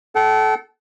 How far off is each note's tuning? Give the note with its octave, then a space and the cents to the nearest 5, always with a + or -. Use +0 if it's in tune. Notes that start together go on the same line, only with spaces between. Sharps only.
A4 -20 F#5 +45